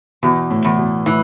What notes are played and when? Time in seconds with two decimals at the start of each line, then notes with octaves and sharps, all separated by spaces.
0.23 E2 B2
0.50 A2
0.65 E2
0.78 B2
1.06 A2 E3